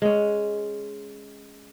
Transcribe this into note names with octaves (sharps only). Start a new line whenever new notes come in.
G#3 C#4